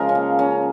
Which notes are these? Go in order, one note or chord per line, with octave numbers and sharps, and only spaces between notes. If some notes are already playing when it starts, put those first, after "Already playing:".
Already playing: C#3 F3 G#3 A#4
C#4
A#3
C#4